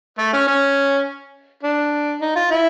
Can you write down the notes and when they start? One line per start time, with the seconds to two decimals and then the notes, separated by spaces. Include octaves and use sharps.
0.19 A3
0.33 C#4
0.48 C#4
1.63 D4
2.21 D#4
2.36 F4
2.51 E4